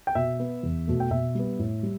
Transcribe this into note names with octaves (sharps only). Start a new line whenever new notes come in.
G5
B2 E5
B3
E2
B2 A3
G5
B2 E5
G3 B3
A2
G3